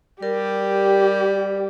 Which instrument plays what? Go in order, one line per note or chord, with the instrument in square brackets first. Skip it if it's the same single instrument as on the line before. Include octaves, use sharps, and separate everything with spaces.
[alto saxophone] G3 [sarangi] G4 [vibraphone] A#4